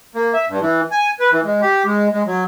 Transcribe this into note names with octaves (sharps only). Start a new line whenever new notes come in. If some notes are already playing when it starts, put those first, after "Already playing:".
A#3
E5
G2
E3
G#5
B4
E3
G#3
G4
G#3
G#3
F#3